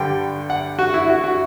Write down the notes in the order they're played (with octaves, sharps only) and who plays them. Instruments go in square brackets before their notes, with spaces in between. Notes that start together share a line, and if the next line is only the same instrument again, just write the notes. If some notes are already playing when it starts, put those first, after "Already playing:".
Already playing: [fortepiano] G2 D3 G3 G5
F#5
F#4
E4
F#4
F#4